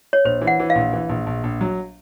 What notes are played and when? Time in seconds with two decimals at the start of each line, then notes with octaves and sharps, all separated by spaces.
0.13 C#5
0.25 A#1 C5
0.41 E3
0.47 F#5
0.59 E3
0.70 F5
0.75 A#1
0.93 E3
1.09 A#1
1.26 A#1
1.43 A#1
1.61 F#3